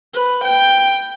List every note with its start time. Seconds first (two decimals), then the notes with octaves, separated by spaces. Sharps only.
0.14 B4
0.45 G5